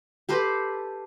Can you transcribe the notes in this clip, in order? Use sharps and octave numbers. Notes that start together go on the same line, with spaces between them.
G4 A4 B4 C5